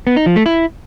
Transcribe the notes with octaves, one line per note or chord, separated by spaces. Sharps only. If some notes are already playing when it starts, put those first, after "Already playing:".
B3
D#4
F3
A3
E4